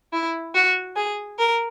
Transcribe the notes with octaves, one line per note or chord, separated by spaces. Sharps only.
E4
F#4
G#4
A#4